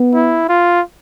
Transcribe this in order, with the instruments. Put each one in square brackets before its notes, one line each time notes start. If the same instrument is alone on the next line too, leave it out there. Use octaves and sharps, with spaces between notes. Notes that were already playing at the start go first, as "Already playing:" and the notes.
Already playing: [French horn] B3
[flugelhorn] E4
F4